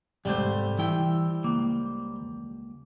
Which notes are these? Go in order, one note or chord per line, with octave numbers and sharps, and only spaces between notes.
G#2 C3 G3 A3 C5
E3 E4 G5
C#2 A#3